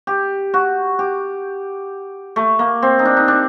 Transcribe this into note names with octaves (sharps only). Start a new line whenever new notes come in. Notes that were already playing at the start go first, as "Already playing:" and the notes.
G4
F#4
G4
A3
A#3
C4
D#4
D4
D#4
D4